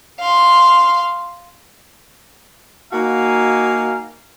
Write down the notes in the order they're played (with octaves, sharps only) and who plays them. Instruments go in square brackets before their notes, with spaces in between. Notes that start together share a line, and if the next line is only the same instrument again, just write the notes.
[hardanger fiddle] F5 C6
[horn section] A#3 D#4 F#4 F5 G#5